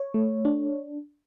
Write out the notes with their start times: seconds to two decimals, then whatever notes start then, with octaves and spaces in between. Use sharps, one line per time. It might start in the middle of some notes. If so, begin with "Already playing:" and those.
Already playing: C#5
0.14 A3
0.45 D4